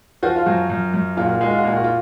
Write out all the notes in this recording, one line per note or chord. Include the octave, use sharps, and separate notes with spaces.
F3 F#4
F4
F#2 F#4
F#2
F#2
A#2 F4
F#4
F4
G#3 F#4
F4
F#4
A#2 F4
F#4
F4